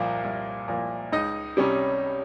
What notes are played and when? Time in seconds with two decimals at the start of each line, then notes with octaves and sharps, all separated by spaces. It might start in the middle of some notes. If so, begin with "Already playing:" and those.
Already playing: C2 A#2 F3 A#3
0.24 C2
0.68 A#2 F3 A#3
1.12 C#2 D#4 D#5
1.57 C3 G3 C#4